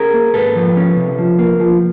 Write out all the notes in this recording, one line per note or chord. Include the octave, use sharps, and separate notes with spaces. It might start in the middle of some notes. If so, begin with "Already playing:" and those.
Already playing: C#4 G#4 A#4
A#3
G#2 A4 B4
F3
C#4
C3
F3
A#3
F3